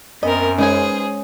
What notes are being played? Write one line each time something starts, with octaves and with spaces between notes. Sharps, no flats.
F#2 B3 C4 A#4 D#5
G#3 C#4 D#4 G#4 B4 C5 G#5